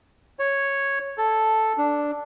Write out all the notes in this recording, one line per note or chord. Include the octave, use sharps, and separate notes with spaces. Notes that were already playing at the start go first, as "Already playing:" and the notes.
C#5
A4
D4